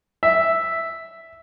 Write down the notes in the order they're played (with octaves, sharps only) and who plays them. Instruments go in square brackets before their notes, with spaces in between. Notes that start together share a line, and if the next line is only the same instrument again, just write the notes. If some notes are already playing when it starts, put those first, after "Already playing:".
[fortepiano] E5